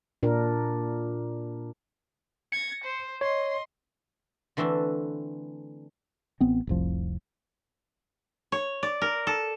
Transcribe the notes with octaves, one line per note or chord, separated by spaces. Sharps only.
A#2 D4 A#4
G#6 A#6 C#7
C5
C#5 D#5 C6
D3 E3 A3 C4 D4
A1 B3 C4
F1 C2 F3
C#5
D5
A#4
A4